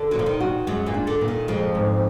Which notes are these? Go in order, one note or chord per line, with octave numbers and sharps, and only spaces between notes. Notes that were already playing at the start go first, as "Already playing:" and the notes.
Already playing: D3 D4
A#2 F#3
F3
D#3
F#4
F#2 F#3 G#3
A#2 A#3
D4
D3
A#2
D#3
F2 F3 G#3
G#2